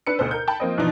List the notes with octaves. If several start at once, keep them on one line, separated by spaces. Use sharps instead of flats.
D4 B4 E6 C#7
D2 B2 A4 C5
A#4 G6
G5 A5 B5
F3 A#3 C4 D#5
B2 E3 F3 D4 D#4